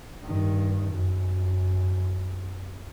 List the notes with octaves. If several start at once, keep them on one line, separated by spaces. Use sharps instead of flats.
G2 D#3
F#2